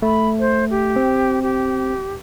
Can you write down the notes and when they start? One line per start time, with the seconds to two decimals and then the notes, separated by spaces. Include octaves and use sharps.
0.02 A3 B5
0.39 C5
0.70 G4
0.96 C4
1.42 G4